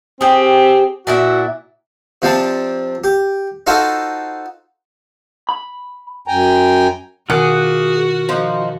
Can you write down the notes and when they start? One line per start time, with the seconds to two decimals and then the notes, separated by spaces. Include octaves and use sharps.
0.21 C4 G4 G#4
1.07 A#2 E4 F#4 E5
2.22 C3 F3 C4 D4 A5
3.04 G4
3.67 D#4 F4 F#4 A4 C5 F5
5.49 B5
6.28 F#2 G5 G#5 A#5
7.30 B2 D#3 F4 F#4 G#4 A#4 F#5 D6
8.29 F3 D#4